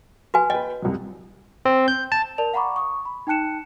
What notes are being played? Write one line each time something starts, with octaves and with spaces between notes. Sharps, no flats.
F#4 B4 G#5
B4 D#5 G5
C2 F#2
C4
G6
A5
A#4 D5 A5 F7
F5 F#5 A#5 B5 C#6 D6
C#6 D#6
B5
D#4 G5 A5 F#6 C#7 E7